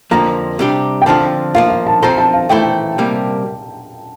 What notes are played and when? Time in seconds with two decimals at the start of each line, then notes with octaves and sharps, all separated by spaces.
0.11 F2 D3 F3 A#3 A#5
0.59 C3 G3 D4 G4
1.02 G5
1.06 D3 F3 C4 F4 A5
1.55 F3 A#3 F4 F5
1.70 F5
1.87 A5
2.02 F3 C4 F4 A4 C5 A#5
2.18 A5
2.34 F5
2.49 E3 A3 E4 A4 C5 G5
2.98 C3 G3 A#3